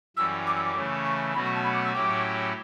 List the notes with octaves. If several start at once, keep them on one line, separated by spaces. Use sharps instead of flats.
F#2 E3 G3 C#4 E6
D6
E6
D6
C#3 E3 A3 C#4
C#6
B2 F#3 A3 C#4 F#4 B5
C#6
A5
B5
D6
E6
A2 F#3 C#4 E4 G4 D6